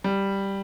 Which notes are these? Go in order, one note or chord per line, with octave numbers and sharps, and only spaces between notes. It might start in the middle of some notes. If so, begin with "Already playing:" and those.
G3